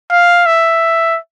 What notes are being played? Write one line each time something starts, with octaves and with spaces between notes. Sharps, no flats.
F5
E5